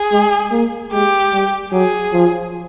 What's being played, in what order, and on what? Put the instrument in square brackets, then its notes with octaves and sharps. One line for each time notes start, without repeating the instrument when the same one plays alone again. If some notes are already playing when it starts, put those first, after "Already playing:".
Already playing: [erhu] G#4
[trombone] G#3
A#3
[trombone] G#3 [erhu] G4
[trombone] G3
[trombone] F#3 [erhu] G#4
[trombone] F3